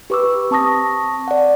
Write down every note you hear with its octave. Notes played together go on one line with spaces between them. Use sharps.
G4 B4 C#6 D6 E6
C4 A5 C#6 D#6 A#6
D5 F#5